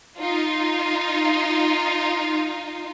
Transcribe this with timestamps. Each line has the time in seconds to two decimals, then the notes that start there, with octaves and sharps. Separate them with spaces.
0.18 D#4 F4